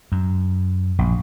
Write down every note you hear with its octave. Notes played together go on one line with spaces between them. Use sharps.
F#2
A#1